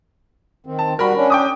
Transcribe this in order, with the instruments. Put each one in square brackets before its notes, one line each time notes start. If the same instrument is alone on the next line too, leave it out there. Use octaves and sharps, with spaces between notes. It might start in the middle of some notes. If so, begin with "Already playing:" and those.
[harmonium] D#3 C4
[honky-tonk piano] A5
[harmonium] G3 F#4 [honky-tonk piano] A#4 B5
[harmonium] C#4 D4
[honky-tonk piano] G5 D6 D#6